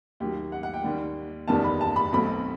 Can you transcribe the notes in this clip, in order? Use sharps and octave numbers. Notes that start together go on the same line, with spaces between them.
D#2 D#3 F#3 G4
F#5
F#5
G5
D#2 D#3 G3
F#1 E2 D#3 G3 B3 A5
B5
A5
B5
B1 B2 F#3 A3 C4 B5